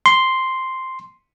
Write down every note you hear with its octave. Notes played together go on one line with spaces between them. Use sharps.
C6